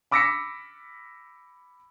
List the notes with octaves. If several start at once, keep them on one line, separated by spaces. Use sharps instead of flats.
B5 D6 E6 A#6 B6 C#7